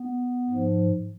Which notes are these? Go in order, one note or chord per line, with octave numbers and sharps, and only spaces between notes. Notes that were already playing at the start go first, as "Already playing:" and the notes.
Already playing: B3
G#2 F3